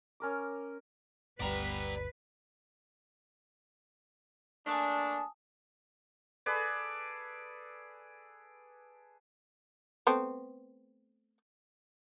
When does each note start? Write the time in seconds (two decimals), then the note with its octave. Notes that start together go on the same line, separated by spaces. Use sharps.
0.20 C#4 A#4 D6
1.40 G1 D2 G3 B3 B4 D5 A#5
4.67 A3 A#3 D4 G#5 A5 D#6
6.46 G#4 A4 B4 D5
10.07 A3 B3 C4